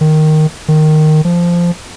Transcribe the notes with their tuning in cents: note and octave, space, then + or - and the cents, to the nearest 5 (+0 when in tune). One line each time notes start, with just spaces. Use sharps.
D#3 -5
D#3 -10
F3 -10